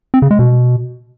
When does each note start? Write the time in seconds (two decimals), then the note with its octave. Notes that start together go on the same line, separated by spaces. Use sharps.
0.14 C4
0.22 C#3
0.31 G#3
0.39 B2